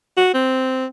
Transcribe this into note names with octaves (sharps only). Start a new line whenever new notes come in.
F#4
C4